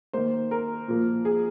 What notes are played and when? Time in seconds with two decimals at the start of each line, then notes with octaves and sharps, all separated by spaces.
0.13 D#3 A#3 C5
0.51 A#4
0.88 A#2 F3 A#3
1.25 G#4